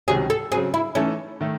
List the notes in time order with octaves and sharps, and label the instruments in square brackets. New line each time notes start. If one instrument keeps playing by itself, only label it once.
[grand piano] C#2 C3 D#3 F#3 C#4 [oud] G#4
[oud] A4
[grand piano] C#3 F#3 C4 [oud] G#4
[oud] E4
[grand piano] E3 A3 D#4 A4 [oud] C#4
[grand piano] D#3 A3